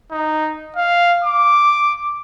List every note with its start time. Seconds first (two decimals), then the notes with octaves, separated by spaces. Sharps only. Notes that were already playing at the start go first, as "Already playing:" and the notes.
0.11 D#4
0.76 F5
1.24 D6